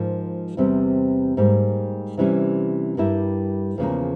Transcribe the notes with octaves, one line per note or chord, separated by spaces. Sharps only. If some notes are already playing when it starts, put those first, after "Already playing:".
Already playing: G#2 F3 A#3 F4
E2 C3 G3 C4
G#2 G3 A#3
C3 E3 G3 C#4
G2 G3 A#3 E4
E2 C#3 F3 A#3